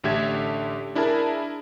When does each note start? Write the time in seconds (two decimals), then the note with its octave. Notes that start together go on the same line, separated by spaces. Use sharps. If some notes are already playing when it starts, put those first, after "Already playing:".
0.04 A1 D3 A3 G4 E5 G#6
0.95 D4 E4 G#4 A#4 A5